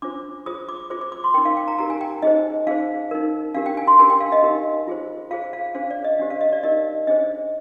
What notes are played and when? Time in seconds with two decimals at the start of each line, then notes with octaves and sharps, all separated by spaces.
0.02 D4 F4 C5 D6
0.46 F4 G#4 C5 D#6
0.69 D6
0.90 F4 G#4 C5 D6
1.01 D6
1.12 D6
1.24 C6
1.34 D#4 A#4 G5
1.45 F5
1.57 G5
1.68 A#5
1.78 D#4 G4 A#4 A#5
1.90 G#5
2.01 G5
2.22 D#4 G#4 C5 D#5
2.67 D#4 G#4 C5 F5
3.11 D#4 A#4
3.54 D4 G4 A#4 F5
3.66 G5
3.77 G#5
3.87 C6
3.99 D4 G4 A#4 G#5
4.10 G5
4.20 F5
4.32 D#5
4.42 D#4 G4 A#4
4.87 F4 G#4 C5
5.31 F4 G#4 C5 F5
5.53 F5
5.75 D4 G#4 C5 F5
5.91 D5
6.04 D#5
6.19 D4 G4 C5
6.30 F5
6.41 D#5
6.52 D5
6.63 D#4 G4 A#4 D#5
7.07 D4 G#4 C5 D#5